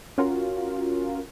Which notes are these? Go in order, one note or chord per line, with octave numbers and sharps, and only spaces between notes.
C#4 F4 F#4 A#4